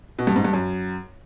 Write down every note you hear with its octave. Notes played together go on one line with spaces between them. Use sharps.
B2
G2
G#2
G2
F#2